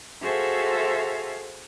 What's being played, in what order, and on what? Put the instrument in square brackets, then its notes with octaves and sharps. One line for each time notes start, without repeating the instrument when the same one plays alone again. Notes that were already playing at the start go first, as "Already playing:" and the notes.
[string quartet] F#4 G#4 A4 C5 E5 F5